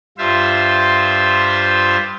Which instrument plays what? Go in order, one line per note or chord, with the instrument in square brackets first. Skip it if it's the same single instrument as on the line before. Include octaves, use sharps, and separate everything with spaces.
[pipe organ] G2 F4 C5 E5